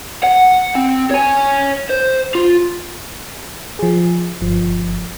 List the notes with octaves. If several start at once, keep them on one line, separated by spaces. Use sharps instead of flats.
F#5
C4
C#5 G#5
C5
F4
F3 G#4
G1 F3